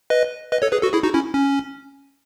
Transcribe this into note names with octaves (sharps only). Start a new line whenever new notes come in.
B4 D#5
B4 D#5
A4 C#5
G#4 B4
F#4 A4
E4 G#4
D#4 F#4
C#4 E4
C#4